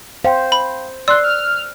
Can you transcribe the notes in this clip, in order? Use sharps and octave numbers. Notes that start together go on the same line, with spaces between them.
C5 F5 G5
B5
D5 C6 E6 F#6
F6